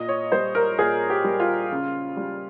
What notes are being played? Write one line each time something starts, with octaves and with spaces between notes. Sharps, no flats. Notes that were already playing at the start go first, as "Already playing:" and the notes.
Already playing: A#2 D#5
C#5
G3 C5
A#4
A#2 G#4
G4
G3
F4
C#3
G3